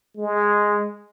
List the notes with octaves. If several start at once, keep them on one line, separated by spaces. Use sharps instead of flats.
G#3